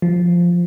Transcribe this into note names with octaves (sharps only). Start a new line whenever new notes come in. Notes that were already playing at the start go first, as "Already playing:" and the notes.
F3